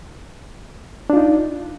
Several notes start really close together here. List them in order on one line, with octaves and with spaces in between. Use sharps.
D4 F4 D#4